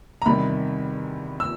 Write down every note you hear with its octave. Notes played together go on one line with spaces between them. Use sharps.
A#5
E2 C3 D#3 G3 B5
E6